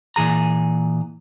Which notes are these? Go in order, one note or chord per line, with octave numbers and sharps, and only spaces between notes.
A#2 E3 G#4 A#5